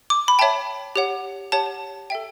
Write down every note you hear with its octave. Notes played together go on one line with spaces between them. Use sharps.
D6
B5
C#5 E5 G5 A5
G4 C#5 F#5
G4 C#5 F#5 A5
A4 E5 G5